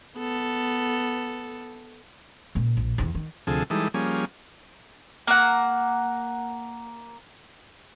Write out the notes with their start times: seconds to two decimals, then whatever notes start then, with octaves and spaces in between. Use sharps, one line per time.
0.17 B3 A4
2.55 A#2 C#3
2.77 A#1
2.98 E2 C3
3.15 D#3
3.47 D2 C3 F3 G#4 A4
3.70 E3 G3 G#3 D#4 A4
3.94 F3 G3 A#3 C#4 G#4
5.27 A#3 F#5